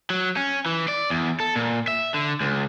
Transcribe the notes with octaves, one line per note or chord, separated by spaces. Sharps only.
F#3
C#4
E3
D5
E2
A4
A#2
E5
D3
C#2